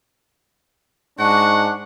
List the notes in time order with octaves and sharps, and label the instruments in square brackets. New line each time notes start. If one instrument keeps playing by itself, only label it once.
[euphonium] G#2 [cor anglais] D4 [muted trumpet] F#5 [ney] C#6